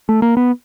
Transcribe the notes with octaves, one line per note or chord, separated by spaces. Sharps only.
A3
A#3
B3